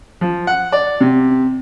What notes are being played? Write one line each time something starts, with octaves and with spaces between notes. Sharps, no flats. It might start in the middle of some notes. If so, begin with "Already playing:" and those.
F3
F#5
D5
C3